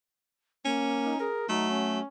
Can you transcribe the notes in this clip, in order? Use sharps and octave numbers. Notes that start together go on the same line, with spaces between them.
A#3 C#4
D#4
G#4 A#4
F#3 A3 D#4
C#4